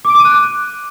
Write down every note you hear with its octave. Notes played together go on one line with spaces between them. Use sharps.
D6
D7
D6
D#7
F#6